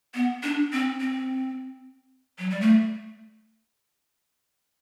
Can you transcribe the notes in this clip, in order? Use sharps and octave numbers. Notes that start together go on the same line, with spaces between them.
B3
D4
C4
C4
F#3
G3
A3